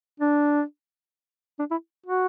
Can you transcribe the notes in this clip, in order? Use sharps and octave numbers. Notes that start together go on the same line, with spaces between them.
D4
D4
E4
F#4